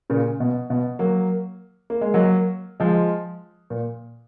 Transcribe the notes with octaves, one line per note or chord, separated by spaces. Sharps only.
A#2 C#3
B2
B2
F#3 A#3
A#3
G#3
F#3 A#3
F3 G#3
A#2